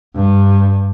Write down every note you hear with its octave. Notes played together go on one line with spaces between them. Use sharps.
G2